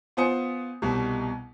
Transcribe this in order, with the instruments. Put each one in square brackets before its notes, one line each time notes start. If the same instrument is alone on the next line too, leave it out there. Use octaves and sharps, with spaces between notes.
[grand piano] B3 F4 C5 G#5 D#6 C#7
C2 B2 G3